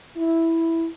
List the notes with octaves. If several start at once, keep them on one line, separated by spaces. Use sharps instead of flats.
E4